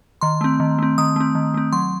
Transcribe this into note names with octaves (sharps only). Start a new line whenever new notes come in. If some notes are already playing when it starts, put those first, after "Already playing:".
D#3 C6
A3 C4
D#3
A3 C4
D#3 D#6
A3 C4
D#3
A3 C4
F#3 C6